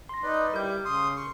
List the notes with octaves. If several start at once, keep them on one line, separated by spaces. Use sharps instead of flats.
C6 A#6
D#4 B4 D5
G3 E4 A#4 D6 G6
C#3 C6 D#6
C6 C#6